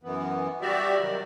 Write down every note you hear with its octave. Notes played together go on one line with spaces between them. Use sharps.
F#2 E3 B3
G3 F#4 G4 D5 E5
C3 D#3 F#3 G3